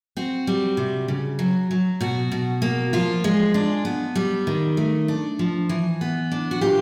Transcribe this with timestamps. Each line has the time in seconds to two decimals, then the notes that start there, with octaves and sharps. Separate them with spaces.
0.17 C4 F#4
0.47 G3
0.77 C3
1.08 C#3
1.39 F#3
1.71 F#3
2.01 B2 F#4
2.32 B2
2.62 A#3
2.93 F3 F4
3.24 G#3
3.54 D4
3.85 B3
4.15 G3
4.47 D#3
4.77 A3
5.08 D4
5.39 F3
5.69 E3
6.01 B3
6.32 D4
6.51 F#4
6.61 A#2 F4 G4